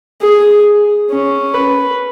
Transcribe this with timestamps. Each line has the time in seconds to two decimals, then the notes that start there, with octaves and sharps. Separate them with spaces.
0.22 G#4
1.11 C#4
1.54 B4